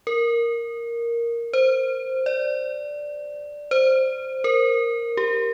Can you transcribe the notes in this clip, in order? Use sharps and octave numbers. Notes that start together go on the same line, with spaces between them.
A#4
C5
D5
C5
A#4
G4